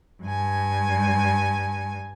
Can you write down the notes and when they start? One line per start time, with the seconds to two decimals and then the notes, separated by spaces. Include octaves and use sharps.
0.23 G2 G#5